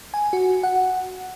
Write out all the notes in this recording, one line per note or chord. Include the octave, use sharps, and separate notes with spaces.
G#5
F#4
F#5